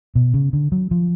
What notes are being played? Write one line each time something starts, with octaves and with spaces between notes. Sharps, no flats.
B2
C#3
D3
F#3
F3